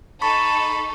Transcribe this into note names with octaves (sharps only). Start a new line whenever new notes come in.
D#4 A4 A5 B5 C#6